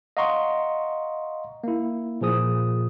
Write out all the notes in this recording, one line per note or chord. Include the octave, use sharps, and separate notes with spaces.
D#5 F5 F#5 A#5 C6 C#6
A#3 E4
A#2 F3 G#4 D#6